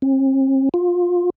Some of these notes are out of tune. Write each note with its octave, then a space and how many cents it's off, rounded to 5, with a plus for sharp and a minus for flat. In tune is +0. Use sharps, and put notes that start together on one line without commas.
C4 +45
F4 +20